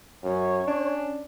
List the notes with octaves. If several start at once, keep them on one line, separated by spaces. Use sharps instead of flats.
F#2 C#5
C#4 D4